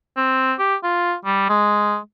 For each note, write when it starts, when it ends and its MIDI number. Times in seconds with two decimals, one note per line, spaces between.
0.17 0.53 60
0.59 0.75 67
0.84 1.14 65
1.25 1.48 55
1.49 1.98 56